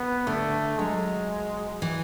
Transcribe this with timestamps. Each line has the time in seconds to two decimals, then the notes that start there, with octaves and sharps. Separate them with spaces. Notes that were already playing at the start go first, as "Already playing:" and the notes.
Already playing: B3
0.27 D3 A3
0.78 F#3 G#3
1.82 E3